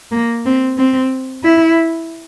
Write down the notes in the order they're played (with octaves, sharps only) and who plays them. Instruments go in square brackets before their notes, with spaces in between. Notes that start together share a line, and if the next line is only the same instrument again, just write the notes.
[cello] A#3
C4
C4
E4